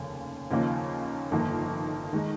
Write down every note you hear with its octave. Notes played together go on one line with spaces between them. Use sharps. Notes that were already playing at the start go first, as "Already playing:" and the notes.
Already playing: F1 D#2 C#3
D#2 C#3 F3 A#3 D#4
G1 F2 D#3 A#3
D#3 G#3 D#4